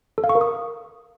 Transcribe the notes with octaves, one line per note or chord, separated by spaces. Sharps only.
A4
F5
C#6
A#4
D#6